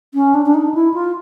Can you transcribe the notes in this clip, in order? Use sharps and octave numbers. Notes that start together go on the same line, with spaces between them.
C#4
D4
D4
D#4
E4
F4